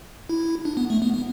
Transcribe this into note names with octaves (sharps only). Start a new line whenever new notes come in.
E4
D4
B3
A3
B3
B3